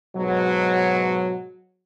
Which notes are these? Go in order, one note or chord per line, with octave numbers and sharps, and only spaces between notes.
G#2 B2 F#3